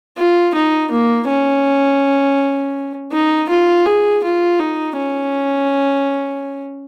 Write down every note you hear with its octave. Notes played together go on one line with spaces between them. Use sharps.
F4
D#4
A#3
C#4
D#4
F4
G#4
F4
D#4
C#4